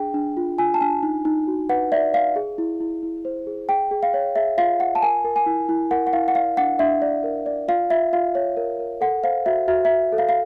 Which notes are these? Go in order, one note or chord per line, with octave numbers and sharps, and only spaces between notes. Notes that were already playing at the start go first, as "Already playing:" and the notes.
Already playing: D4 G#4 G5
D4
F4
F4 G#5
A5
D4 G#5
D#4
D#4
F#4
B4 F#5
D5 E5
D5 F5
G#4
E4
E4
E4
C5
G#4
G#4 G5
G#4
F5
C#5
G#4 E5
F4 F5
F4 F#5
A5
A#4 G#5
A#4
G#5
E4
E4
A#4 F#5
F#5
E4 F5
F#5
D5 F5
D4 F#5
D4 E5
D5
A#4
D5
F4 F5
F4 E5
F4 F5
C#5
A#4
A#4
A4 F#5
C5 F5
F#4 E5
F#4 E5
E5
F#4
A4
F5
F5